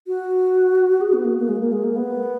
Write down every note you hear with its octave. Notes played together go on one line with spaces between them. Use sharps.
F#4
G#4
B3
A#3
A#3
G#3
A#3
G#3
A#3
B3